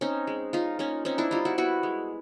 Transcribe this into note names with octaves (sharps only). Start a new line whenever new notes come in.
C4 C#4 D#4
G#3
C#4 D#4 F4
A#3 C#4 D#4
C4 C#4 D#4
D4 E4
G3 D#4 F4
E4 F#4
B3 E4 F#4
G#3